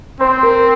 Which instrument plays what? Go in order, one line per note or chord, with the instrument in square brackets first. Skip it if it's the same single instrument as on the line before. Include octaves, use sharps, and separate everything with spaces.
[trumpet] C4 [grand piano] C5
[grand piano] A#4